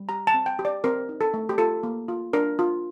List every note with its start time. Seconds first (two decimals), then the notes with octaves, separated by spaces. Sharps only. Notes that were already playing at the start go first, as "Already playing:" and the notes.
Already playing: G3
0.09 G4 A#5
0.27 A5
0.34 C4
0.46 G5
0.59 G4
0.65 D5
0.84 C4 A#4
1.09 D#4
1.21 A4
1.34 A3
1.49 G4
1.58 F4 A4
1.83 A#3
2.08 F4
2.33 D4 A#4
2.59 F4